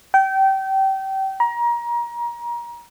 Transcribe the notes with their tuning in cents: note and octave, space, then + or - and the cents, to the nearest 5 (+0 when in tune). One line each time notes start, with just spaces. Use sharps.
G5 -25
A#5 +30